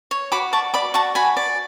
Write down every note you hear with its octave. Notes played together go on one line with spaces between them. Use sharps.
C#5
F#4 B5 D6
D5 A5 C#6
D5 B5 D6
F#4 A5 C#6
F#4 G#5 B5
D5